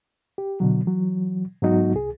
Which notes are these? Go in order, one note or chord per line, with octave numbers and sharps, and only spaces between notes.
G4
B2 D3 F#3
E3 F#3
G#2 F#3 B3 D#4 F#4
C2 G#4